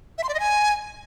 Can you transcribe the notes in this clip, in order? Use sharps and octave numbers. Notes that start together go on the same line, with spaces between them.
E5
C6
D5
D#5
G#5